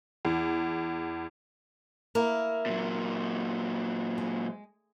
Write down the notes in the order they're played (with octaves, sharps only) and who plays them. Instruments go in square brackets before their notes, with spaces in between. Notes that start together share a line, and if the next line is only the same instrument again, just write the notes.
[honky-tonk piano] E2
[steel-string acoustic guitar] A#3 E4 A#4
[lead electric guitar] A#2 F#3
[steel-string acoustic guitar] G#3